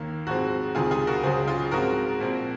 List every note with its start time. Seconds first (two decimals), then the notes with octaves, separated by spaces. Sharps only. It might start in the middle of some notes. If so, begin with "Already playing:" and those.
Already playing: D#2 D#3 A#3
0.27 G#2 F3 G#3 C4 F#4
0.75 C#2 C3 D#3 F4 G#4
0.91 F4 G#4
1.07 F#4 A#4
1.23 C#2 C#3 F#3 G#4 C5
1.48 F4 G#4
1.71 G#2 F3 G#3 C4 F#4 A#4
2.20 A#2 F3 C4